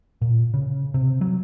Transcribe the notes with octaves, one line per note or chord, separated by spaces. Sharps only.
A#2
C#3
C3
F#3